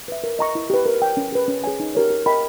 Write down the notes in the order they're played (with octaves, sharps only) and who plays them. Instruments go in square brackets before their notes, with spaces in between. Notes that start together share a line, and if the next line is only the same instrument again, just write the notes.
[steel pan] B4 E5
A#4
D#5 A#5 C#6
E4
G4 B4
A#4
C#5 G5
C#4
G#4 B4
C#4
G#4 C#5 G#5
D#4
G4 A#4 C#5
G4
A#4 D#5 G5 B5